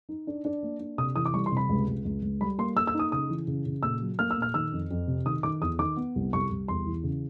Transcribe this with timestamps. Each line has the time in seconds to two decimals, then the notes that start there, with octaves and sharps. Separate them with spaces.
0.09 D#4
0.27 D4
0.45 D4
0.63 A#3
0.80 D4
0.98 C3 D#6
1.15 E3 D#6
1.26 D6
1.34 G3 C#6
1.46 C6
1.52 C3
1.57 B5
1.69 C#2
1.87 C#2
2.05 C#2
2.22 C#2
2.40 G3 B5
2.58 A#3 C6
2.76 A#3 E6
2.87 E6
2.94 D#4
2.99 D#6
3.12 C#3 D#6
3.29 E3
3.47 C#3
3.66 C#3
3.83 A#2 E6
4.01 F#3
4.19 A#3 F6
4.31 E6
4.37 A#2
4.42 F6
4.54 D#3 E6
4.72 F2
4.91 F2
5.07 C3
5.26 D#3 D#6
5.43 D#3 D6
5.62 E2 D#6
5.79 D#3 D6
5.96 B3
6.15 C2
6.33 C2 C#6
6.50 C2
6.68 E2 C6
6.86 E3
7.03 C#3